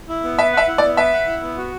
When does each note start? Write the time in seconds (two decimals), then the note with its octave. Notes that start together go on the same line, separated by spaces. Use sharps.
0.09 E4
0.24 B3
0.38 B4 E5
0.53 E5 F#5
0.68 E4
0.78 D5
0.83 B3
0.97 B4 E5
1.13 F#5
1.27 E4
1.42 B3
1.57 F#4